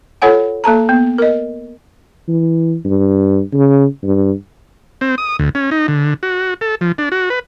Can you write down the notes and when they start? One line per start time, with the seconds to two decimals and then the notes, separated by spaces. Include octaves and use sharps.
0.22 F4 A4 C#5 F#5 G#5
0.64 A#3 A4 A5 A#5
0.89 B3
1.18 A#4 D#5
2.28 E3
2.85 G2
3.54 C#3
4.03 G2
5.01 C4
5.18 D#6
5.39 D2
5.55 C#4
5.71 D#4
5.88 D3
6.23 F#4
6.61 A4
6.81 F3
6.98 D4
7.12 F#4
7.30 B4